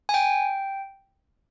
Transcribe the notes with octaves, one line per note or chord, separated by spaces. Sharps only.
G#5
G5